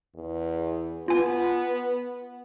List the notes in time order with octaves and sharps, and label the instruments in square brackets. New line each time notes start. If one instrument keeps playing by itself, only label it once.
[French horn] E2
[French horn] B3 [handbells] F4 G#5